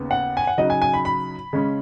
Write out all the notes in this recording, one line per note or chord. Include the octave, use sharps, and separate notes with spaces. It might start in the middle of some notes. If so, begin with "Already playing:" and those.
Already playing: D#2 C#3 B3
F#5
G#5
F#5
C#3 F#3 D#4 D#5
G#5
G#5
B5
B5
C#3 G#3 C#4